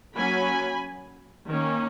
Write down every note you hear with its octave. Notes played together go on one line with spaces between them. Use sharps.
F#3 A#3 C#4 G#5 B5
D#3 A#3 C#4